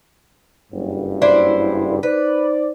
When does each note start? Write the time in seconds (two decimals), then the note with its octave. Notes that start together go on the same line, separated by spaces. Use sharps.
0.72 F#1 G2
1.22 D4 E4 C5
2.03 D#4 B4 C5 D5